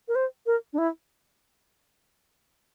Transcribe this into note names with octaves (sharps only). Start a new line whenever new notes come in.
A#4
C5
A#4
D4
E4